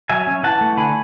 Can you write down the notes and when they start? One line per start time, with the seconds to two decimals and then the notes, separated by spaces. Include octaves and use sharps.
0.09 F#3 E5 G#5
0.27 C#4
0.43 E3 F#5 A5
0.61 A3
0.77 D3 G#5 B5